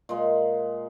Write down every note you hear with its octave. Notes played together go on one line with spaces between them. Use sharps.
A#2 G#3